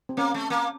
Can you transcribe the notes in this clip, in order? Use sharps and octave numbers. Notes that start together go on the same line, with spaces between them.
C4
A#3 C#4
A3
A#3